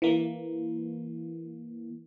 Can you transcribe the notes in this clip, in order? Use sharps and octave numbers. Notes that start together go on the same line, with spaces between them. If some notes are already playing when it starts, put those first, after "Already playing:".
E3 A#3